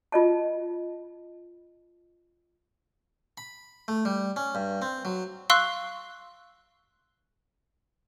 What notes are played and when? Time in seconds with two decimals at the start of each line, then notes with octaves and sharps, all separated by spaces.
0.12 F4 D#5 A5
3.38 B5
3.88 A3
4.05 G3
4.36 C#4
4.55 G2
4.82 C4
5.05 F#3
5.50 F5 C6 C#6 E6 F#6